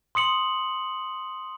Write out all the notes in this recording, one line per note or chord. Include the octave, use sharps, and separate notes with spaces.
C6 D#6 C#7 F#7